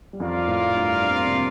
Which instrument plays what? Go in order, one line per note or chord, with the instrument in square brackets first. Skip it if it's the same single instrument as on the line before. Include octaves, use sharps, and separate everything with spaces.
[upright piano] G3
[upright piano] F2 F3 [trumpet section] F4 A#4 D5 F5
[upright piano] A2 A3
G2 G3
D4
C4
A#3
C3 C4